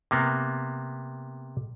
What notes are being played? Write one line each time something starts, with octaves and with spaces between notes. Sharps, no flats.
C3 A#3 B3